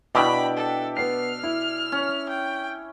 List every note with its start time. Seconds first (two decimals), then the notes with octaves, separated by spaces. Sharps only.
0.15 B2 D4 E4 E5 G5 B5 D6
0.57 A4
0.97 B3 F6 C7
1.43 E4
1.92 C#4
2.29 G5